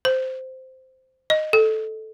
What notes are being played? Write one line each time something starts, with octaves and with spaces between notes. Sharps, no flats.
C5
D#5
A4